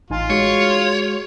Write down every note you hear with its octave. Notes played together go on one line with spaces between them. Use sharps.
A1 D#4 F4 G#5
G#3 F#4 G#4 C#5